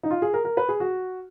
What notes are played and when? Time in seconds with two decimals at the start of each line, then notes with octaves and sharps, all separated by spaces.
0.03 D#4
0.11 F4
0.22 G#4
0.34 A#4
0.45 A#4
0.57 B4
0.69 G#4
0.80 F#4